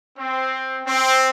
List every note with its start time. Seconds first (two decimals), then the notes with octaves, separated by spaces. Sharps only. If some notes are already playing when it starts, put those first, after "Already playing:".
0.18 C4
0.86 C4